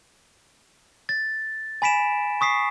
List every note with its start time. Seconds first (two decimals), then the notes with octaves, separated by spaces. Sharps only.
1.09 A6
1.82 G#5 B5 B6 D7 E7
2.41 C#6 D#6 B6 C7